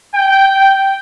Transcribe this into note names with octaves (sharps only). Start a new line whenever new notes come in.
G5